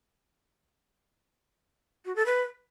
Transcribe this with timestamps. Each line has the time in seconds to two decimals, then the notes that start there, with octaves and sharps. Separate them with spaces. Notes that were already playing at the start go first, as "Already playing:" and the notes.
2.05 F#4
2.16 A4
2.26 B4